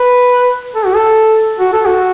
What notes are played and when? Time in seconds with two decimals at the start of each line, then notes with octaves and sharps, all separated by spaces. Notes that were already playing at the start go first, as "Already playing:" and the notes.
Already playing: B4
0.75 A4
0.86 F#4
0.96 A4
1.59 F#4
1.73 A4
1.86 F#4